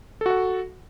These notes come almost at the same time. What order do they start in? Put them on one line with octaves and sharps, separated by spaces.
A4 F#4 F#5